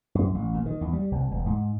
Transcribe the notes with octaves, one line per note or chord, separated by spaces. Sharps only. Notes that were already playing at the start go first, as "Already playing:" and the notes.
F#2
A1
A#2
D#3
E2
G3
C2
E1
G#2